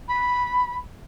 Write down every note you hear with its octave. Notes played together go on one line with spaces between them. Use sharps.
B5